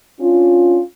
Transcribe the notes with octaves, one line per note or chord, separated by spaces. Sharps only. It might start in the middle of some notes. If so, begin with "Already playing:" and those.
C#4 D4 F4